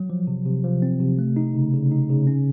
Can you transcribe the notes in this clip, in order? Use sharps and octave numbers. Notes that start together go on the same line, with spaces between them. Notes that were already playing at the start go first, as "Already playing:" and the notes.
Already playing: F#3
F3
C3
C3
F3
C4
C3
A3
D#4
C#3
C#3
D#4
C#3
C#4